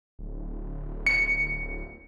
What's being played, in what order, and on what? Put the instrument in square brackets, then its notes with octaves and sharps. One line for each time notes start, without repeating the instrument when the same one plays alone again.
[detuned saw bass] D1
[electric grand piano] C#7